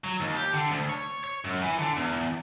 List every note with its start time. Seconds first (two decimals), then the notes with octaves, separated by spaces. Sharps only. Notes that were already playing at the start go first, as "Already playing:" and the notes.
0.04 F#3
0.20 D#2
0.36 G4
0.53 D3
0.71 D2
0.89 C#5
1.24 C#5
1.44 F#2
1.62 E3
1.79 D3
1.96 E2